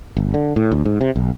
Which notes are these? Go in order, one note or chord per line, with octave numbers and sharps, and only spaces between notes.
G1
D3
A2
D2
G#2
C3
B1